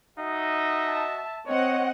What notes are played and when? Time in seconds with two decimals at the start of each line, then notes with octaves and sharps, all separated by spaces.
0.19 D#4 F#4 D#5 E5
0.84 A5
1.47 C4 C#5 D#5 F#5